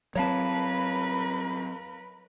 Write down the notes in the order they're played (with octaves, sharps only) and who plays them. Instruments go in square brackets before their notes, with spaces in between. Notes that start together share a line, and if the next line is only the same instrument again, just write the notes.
[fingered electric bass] F#3 C4 [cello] A#4 B4 [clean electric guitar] C#5 F5 A5